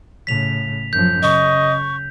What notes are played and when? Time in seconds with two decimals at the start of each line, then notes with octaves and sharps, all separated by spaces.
0.27 A2 C#3 B6 F7
0.93 F#2 F3 G6
1.23 C#3 D#5 C#6